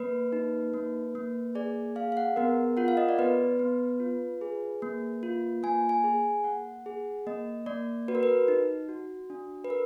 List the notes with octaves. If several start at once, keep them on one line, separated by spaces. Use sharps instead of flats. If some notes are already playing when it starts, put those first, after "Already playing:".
Already playing: A#3 B4
D#4
A#3
A#3
G#4 D5
G#4 F5
F5
F#5
B3 A#4
F4 F#5
F5
D#5
D5
B3 B4
B3
F4
G#4
A#3
F4
A#3 G#5
G#5
G#4
A#3 F#5
G#4
A#3 D#5
A#3 D5
F#4 B4
A#4
B4
D#4
F#4
D4
B4
A#4